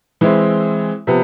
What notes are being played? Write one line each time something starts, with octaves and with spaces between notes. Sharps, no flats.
E3 G#3 C4 E4
C3 F3 B3